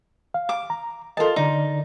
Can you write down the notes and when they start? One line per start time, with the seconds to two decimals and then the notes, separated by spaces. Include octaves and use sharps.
0.34 F5
0.49 D6
0.70 A#5
1.17 F4 A4 A#4 D#5 A5
1.36 D3 D#4 D5